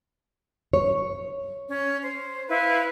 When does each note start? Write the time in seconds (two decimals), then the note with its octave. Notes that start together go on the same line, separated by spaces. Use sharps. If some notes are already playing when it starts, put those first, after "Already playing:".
0.73 C#5
1.67 C#4
2.02 C5
2.48 E4 B4 F5